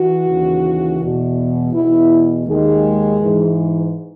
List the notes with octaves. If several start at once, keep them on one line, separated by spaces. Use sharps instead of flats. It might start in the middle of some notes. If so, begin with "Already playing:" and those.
Already playing: E3 F#4
D#2 C#3 E3
E2 B2
E2 B2 E4
D#2 D#3 G#3
G#2 E3